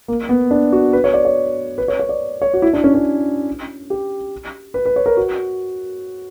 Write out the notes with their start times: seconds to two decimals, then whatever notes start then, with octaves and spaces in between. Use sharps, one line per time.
0.08 A#3
0.29 B3
0.51 D4
0.72 F#4
0.93 B4
1.04 C#5
1.14 D5
1.25 C#5
1.78 B4
1.88 C#5
1.99 C#5
2.09 D5
2.42 C#5
2.54 F#4
2.62 E4
2.73 D4
2.84 C#4
2.94 C#4
3.90 G4
4.74 B4
4.86 B4
4.96 C#5
5.06 A#4
5.17 F#4